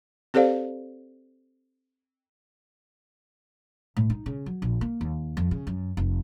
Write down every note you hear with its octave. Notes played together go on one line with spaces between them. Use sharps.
C4 G4 A4 C5 D5 F5
A2
D#4
C#3
F#3
A#1
A#3
D#2
F2
C#3
F#2
F1